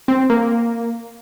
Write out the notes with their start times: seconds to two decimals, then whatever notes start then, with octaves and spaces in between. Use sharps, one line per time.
0.08 C4
0.30 A#3